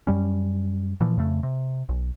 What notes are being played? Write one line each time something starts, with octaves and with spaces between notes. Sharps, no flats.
F#2 G3 C#4
A#2 E3 F3
F2 C#3 A3
C3
B1